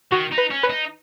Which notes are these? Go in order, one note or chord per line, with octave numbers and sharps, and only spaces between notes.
D#3 F#4
D#4
B4
C#4
B4
D#4